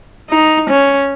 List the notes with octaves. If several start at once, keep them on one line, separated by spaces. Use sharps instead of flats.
D#4
C#4